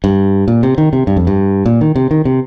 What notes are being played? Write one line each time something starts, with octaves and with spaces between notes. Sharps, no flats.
G2
A#2
C3
D#3
C3
G2
F2
G2
A#2
D#3
C3
D#3
C3